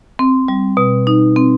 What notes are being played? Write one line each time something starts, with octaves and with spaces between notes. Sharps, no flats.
C4
G3
B2
D#4
C4